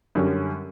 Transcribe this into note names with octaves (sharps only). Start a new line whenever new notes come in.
F#2 D3 G3 C#4